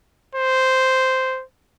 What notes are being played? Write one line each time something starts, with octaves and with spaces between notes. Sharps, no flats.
C5